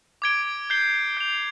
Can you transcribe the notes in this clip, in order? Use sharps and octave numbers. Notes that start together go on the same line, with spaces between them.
D6 G#6 D7 G7
G6 C7 G7
G6 C7 F7